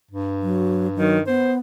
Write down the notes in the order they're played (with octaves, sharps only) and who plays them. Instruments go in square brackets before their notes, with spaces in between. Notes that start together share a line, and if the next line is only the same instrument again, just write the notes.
[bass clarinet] G2
[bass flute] F#3
[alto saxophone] D#3 [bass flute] F#3
[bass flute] B3 [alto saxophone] C5